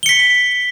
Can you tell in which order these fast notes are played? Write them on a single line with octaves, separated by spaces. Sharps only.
G7 C#7 B6